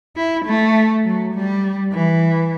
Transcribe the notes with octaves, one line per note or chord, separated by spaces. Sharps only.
E4
A3
F#3
G3
E3